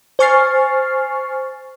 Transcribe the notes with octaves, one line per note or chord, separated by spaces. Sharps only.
C5 G#5 C#6 F6 A6 C7